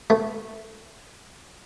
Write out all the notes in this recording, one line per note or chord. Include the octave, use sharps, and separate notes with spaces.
A3